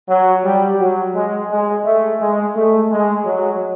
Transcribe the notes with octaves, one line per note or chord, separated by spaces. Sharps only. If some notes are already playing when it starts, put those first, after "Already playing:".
F#3
G3
F#3
G#3
G#3
A3
G#3
A3
G#3
F#3